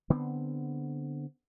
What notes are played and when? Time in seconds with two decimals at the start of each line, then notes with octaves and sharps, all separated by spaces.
0.10 D3 B3 C4